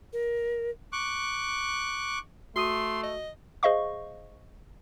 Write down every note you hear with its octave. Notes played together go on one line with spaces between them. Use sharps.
A#4
C#6 D6 F#6
A3 F#4 C6 D#6 D#7
D#5
G#4 C5 D#5 F5 C#6